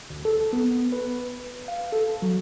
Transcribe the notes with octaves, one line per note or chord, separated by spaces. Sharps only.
D2
A4
B3
B4
F5
A4
F#3